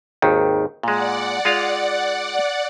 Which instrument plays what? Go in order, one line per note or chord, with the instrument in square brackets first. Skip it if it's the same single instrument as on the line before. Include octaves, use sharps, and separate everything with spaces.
[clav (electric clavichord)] G#1 D#2 D#3
[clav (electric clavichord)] A#2 G#3 [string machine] D5 F#5
[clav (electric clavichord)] G#3 F4 F5